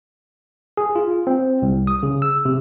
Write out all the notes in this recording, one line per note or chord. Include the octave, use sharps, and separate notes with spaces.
G#4
F4
C4
C2
D#6
C#3
E6
C3